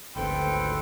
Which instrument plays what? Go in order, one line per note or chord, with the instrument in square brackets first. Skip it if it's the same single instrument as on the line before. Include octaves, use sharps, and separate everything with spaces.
[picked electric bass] G#1 D2 [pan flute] A4 [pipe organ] B4 C5 [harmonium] G5